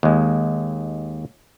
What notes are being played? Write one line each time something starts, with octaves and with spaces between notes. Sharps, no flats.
D#2 G#3